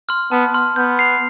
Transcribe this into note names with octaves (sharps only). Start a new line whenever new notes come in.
C6 F6
B3 A5
C6 F6
B3 G6
C7 F7